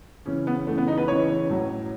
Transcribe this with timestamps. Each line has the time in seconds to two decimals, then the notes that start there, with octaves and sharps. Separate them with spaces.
0.26 C#3 E3 C#4
0.47 B3
0.67 C#3 E3 A3
0.78 B3
0.88 D#4
0.98 B4
1.08 C#3 E3 C#5
1.49 A2 F#3